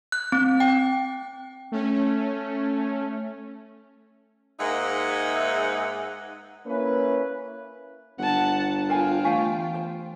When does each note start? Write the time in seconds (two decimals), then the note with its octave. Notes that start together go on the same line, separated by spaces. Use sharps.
0.12 F#6
0.32 C4
0.60 G5
1.72 A3 C#4
4.60 G#2 G#3 A#3 D#4 E5 F#5
6.67 A#3 C#4 E4 B4
8.18 G1 F#5 A5
8.89 F4 A#4 F5 G5 G#5
9.25 E3 A3 F5 G#5 C#6
9.74 C5